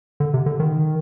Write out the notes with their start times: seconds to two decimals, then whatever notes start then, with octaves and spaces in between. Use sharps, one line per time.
0.20 D3
0.34 C3
0.46 D3
0.60 D#3